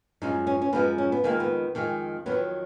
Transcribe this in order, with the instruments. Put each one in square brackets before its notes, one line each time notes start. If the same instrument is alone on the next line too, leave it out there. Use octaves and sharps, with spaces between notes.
[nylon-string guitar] F#2 F3 G#3 D#4
C#4
C#4
F#2 F3 G#3 B3
C#4
B3
F2 D#3 G#3 A#3
B3
F2 D#3 G#3
F2 D#3 F#3 B3